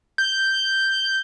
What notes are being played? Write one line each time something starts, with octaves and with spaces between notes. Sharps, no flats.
G6